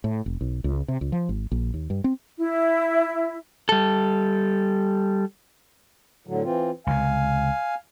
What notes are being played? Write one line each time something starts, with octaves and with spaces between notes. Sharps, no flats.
A2
F1
B1
C#2
C3
C#2
F3
G#1
A#1
D#2
G2
C4
E4
G3 A4
A2 D3 F#3
E3 C4 F4
C#2 C3 F5 G#5